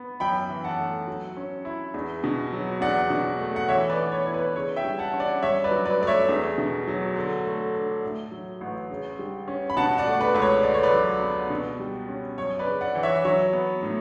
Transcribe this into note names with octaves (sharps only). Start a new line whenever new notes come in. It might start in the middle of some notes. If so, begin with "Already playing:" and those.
Already playing: B3
F#2 G5 B5
E3
F#5 A5
A3
F#3
C#4
E4
E2
B2
F#3
E2 D5 F#5
B2
A3
F#5
E3 C#5 E5
B4 D5
B3
C#5
E4 C#5
B4
C#3 C#5
E5 G5
G3
F#5 A5
C#4
D5 F#5
G2 C#5 E5
B4 D5
F#3
B4 D5
A3 D5
C#5 E5
E2
B2
F#3
D3
A3
D4
A2
F#3
A1
C#3
G3
C#4
B5
B2 F#5 A5
D5 F#5
A3
B4 D5
C#2 B4
C#5
D3 D5
C#5
B4 D5
F#3
B3
B2
G3
C#4
F#2 C#5
B4 D5
C#3
D5 F#5
E3
C#5 E5
F#3 C#5
B3
A2